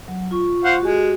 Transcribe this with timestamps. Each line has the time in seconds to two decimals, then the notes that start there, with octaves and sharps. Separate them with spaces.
0.08 F#3
0.31 F4 C#6
0.64 C5 F5 F#5
0.81 G#3 F#4 G4 G#5